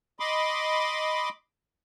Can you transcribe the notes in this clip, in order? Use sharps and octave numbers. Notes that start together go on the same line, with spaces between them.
D#5 B5 C6 D6